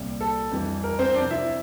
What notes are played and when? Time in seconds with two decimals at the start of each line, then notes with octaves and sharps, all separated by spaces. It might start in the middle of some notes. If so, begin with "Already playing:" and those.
Already playing: C2 A#2 G3
0.21 A4
0.51 F2 E3 G3
0.84 A#4
0.99 C4 C5
1.14 C3 F3 C4 D4 D5
1.31 E4 E5